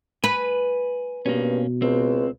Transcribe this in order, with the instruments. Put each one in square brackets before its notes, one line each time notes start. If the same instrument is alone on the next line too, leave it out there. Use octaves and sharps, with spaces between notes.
[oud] B4 [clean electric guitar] G#5 B5
[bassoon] G2 [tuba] B2 [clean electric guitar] A#3 C#4
[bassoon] C#2 [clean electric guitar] C4